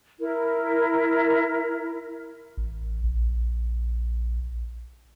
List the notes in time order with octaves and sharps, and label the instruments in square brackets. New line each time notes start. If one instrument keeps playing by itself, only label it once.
[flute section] E4 A#4
[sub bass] A1
A#1